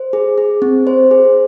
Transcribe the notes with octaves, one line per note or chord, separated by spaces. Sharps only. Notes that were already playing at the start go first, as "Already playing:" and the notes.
Already playing: C5
G#4
G#4
C4
C5
G#4